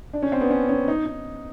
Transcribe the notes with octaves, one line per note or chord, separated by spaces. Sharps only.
D4
C#4
C4
B3
C#4
C#4
D#4
D#4